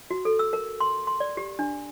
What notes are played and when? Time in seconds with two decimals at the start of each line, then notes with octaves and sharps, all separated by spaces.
0.10 F#4
0.25 A4
0.39 E6
0.53 A#4
0.80 C6
1.07 C6
1.20 D5
1.37 G4
1.59 D4